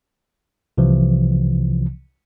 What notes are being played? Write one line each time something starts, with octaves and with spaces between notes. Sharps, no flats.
C2 C3 E3 F3